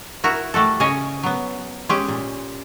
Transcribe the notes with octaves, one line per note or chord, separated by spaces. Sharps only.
E4 F#4 A#4
G3 A3 F#4 A4
C#3 C#4 C#5 D#5 G#5
F#3 B3
G#3 C#4 G4
A#2